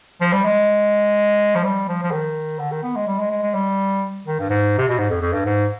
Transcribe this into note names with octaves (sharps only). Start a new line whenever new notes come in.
F3
G3
G#3
F3
G3
F3
F3
D#3
D3
D#3
B3
G#3
G3
G#3
G#3
G#3
G3
D#3
G2
G#2
C3
B2
G#2
F2
F2
G2
G#2